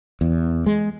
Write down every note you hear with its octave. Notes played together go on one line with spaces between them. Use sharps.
E2
G#3